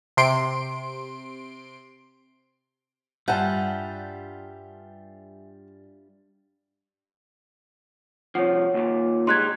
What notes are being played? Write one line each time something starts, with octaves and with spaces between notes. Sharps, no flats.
C3 C6 D7
G2 G3 F4 E5 F#5 G#5 A5 G6
C2 F3 C#5 F#5
D#2 A#2
G3 G#3 D#4 C6 F#6 G#6